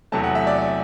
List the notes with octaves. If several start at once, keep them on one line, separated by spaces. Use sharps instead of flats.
E2 C3 F#3 A3 A5
F#5
E5
D5
D5